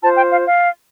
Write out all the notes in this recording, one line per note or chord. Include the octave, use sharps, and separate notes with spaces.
F4 C5 A5
G5
F5
F5